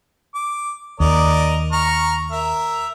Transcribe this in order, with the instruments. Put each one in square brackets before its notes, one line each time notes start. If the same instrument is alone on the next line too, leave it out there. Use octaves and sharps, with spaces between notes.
[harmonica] D6
[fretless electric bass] D#2 [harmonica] A#4 D5 D#5
[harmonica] A#5 C#6 F6
A#4 E5